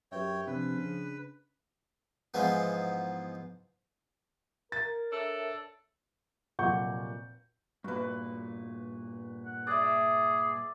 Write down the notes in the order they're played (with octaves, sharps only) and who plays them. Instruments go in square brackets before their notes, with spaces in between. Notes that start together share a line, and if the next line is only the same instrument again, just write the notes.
[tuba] F#2 [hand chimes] G4 B4 E5 [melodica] C#5 G5
[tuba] C3 [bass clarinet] F3 [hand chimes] D4 [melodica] B4
[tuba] C#3
[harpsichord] G#2 E3 F3 G#3 B3
[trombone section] A#4 [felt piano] A6
[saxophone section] D4 A4 [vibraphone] C#5 E5 A5
[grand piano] F1 A#2 F#3 F#5 C#6 G6
[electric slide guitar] G2 A#2 [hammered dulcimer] F#4 B4
[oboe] F#5
[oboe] G#4 [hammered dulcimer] D5 E5